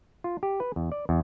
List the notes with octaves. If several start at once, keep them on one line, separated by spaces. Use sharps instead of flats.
F4
G4
B4
E2
D5
E2